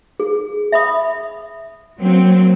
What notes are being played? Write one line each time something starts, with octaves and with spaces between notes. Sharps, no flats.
G#4
E5 B5 D#6
F#3 A#3 C4